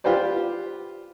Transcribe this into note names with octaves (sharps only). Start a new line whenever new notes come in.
F4 G4 B4 C5 D5